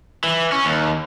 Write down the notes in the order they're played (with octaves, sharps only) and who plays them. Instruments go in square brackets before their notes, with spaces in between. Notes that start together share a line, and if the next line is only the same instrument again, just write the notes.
[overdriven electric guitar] E3
C#4
D#2